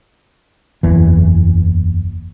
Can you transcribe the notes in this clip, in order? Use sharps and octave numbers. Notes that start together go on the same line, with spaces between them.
F#1 E2 E3